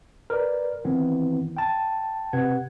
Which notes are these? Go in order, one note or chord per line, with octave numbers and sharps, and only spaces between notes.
A#4 B4 D5
D#3 E3 B3 C4 E4
G5 A5
C3 B4 F#5 G#6